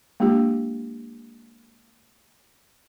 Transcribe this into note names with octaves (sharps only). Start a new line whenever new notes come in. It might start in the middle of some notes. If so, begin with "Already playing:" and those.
G#3 A#3 D4 F4 G4